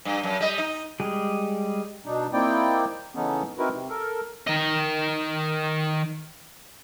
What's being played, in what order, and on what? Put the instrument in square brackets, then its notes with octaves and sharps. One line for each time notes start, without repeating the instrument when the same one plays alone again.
[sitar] G2
F#2
G3 D#5
D#4
[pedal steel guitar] G3 G#3 G4 G#4
[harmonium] B2 D4 D#4
A#3 C4 D#4 E4 D5 G5
C#3 E3 A3 B3 C#4 D#4
C4 D#4 E4 F#4 A#4 B4
C3
A4 A#4
[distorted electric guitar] D#3 D#5